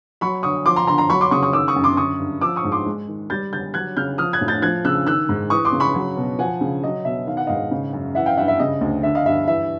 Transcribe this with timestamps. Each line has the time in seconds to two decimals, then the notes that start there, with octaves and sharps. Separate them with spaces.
0.21 F#3 B5 C#6
0.43 D3 C#6 D#6
0.65 F3 C6 D6
0.76 A#5 C6
0.87 D3 A#5 C6
0.98 A#5 C6
1.10 F#3 B5 C#6
1.21 C6 D6
1.31 C#3 C#6 D#6
1.43 C#6 D#6
1.53 D#3 D6 E6
1.68 C#6 D#6
1.76 F#2
1.84 C6 D6
1.97 D3 C#6 D#6
2.19 G2
2.41 F3 D6 E6
2.56 C#6 D#6
2.64 G#2
2.72 C6 D6
2.86 G#3
3.08 D#3
3.30 G3 G6 A6
3.52 D3 G6 A6
3.74 F#3 F#6 G#6
3.97 C#3 F6 G6
4.18 F3 D#6 F6
4.33 F#6 G#6
4.41 A2
4.48 G6 A6
4.62 F3 F#6 G#6
4.85 C#3 E6 F#6
5.07 D#3 E6 F#6
5.29 G#2
5.50 E3 C#6 D#6
5.65 C6 D6
5.73 C#3
5.80 B5 C#6
5.95 F#3
6.17 B2
6.39 F3 F#5 G#5
6.61 C#3
6.83 F#3 D#5
7.05 B2 E5
7.27 D#3 F5
7.37 F#5
7.47 G#2 D#5 F5
7.71 C#3
7.93 F#2
8.15 E3 E5 F#5
8.26 F5 G5
8.37 G2 E5 F#5
8.48 E5
8.60 C#3 D#5
8.81 D2
9.03 D3 E5
9.15 D#5 F5
9.26 G2 E5
9.48 E3 E5